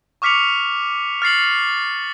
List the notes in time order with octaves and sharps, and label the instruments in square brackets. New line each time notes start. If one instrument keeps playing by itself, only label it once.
[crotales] C#6 D6 F6 B6 C#7 F7
F6 A6 C7 F#7